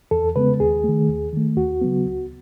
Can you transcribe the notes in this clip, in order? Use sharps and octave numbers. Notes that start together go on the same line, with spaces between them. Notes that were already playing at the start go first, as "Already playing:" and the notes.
E2 A4
C#3 G#3 B3 B4
D#2 G#4
D#3 A3
D#2
D#3 A3
D#2 F#4
C#3 F#3 B3
C#2